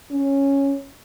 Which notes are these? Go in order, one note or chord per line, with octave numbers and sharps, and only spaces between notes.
C#4